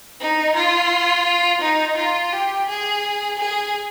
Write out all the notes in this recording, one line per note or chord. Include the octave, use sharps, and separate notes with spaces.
D#4
F4
D#4
F4
G4
G#4
G#4